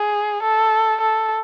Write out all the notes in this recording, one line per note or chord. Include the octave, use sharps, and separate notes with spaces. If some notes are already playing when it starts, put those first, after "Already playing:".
Already playing: G#4
A4
A4